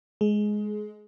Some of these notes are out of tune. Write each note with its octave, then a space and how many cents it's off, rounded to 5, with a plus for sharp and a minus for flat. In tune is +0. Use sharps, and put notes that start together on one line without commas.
G#3 +10 G#4 +25